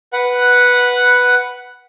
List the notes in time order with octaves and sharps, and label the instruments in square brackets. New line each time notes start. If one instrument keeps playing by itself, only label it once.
[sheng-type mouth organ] B4 F#5